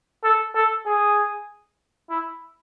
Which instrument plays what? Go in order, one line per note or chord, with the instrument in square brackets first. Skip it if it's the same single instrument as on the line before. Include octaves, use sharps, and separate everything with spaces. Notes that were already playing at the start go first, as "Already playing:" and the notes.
[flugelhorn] A4
A4
G#4
E4